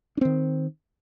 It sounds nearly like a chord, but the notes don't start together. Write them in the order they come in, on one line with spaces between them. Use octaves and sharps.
D4 C4 D#3